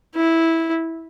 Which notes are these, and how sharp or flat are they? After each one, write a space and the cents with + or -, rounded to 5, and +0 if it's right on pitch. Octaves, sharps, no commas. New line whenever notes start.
E4 -10